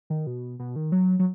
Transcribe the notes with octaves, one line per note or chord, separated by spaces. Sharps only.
D#3
B2
B2
D#3
F#3
F#3